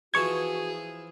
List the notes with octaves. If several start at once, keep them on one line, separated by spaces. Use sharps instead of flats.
E3 F3 E4 F#4 G#4 C#6 G#6